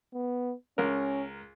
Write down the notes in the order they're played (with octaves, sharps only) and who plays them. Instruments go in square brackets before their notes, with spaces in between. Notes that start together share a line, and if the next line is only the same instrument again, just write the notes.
[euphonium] B3
[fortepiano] C#2 A#4 [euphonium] C#4